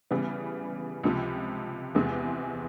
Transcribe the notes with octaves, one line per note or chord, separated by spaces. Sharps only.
C#3 E3 G3 B3
C#2 C3 F3
E2 C3 E3 G#3